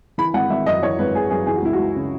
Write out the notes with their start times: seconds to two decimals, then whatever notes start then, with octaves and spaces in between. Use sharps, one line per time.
0.18 E3 B5
0.34 G#1 F#5
0.50 G#1 E5
0.66 F#2 D#5
0.82 E3 C#5
0.99 G#1 B4
1.14 G#1 G#4
1.30 F#2 G#4
1.46 E3 G#4
1.56 F#4
1.62 C#2 E4
1.73 F#4
1.79 C#2
1.95 C#3